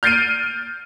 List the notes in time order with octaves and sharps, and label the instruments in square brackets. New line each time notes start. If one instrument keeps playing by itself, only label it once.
[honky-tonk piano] F6 G6 A6 C7 D7 D#7